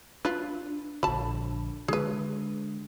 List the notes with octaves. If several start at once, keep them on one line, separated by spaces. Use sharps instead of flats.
D4 F4 B4
A#1 D3 A5 B5
D3 G#3 G#4 B4